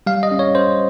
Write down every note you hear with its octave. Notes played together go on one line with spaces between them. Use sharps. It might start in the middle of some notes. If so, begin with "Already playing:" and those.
G3 F5
D#5
C#4
C#5
C#4 C5